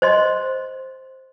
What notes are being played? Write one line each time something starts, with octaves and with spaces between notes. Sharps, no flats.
C5 D#5 C6